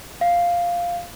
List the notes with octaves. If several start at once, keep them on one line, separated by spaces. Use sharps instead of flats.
F5